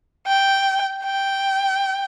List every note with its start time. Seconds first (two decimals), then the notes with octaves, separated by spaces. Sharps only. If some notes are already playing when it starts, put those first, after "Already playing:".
0.27 G5
1.05 G5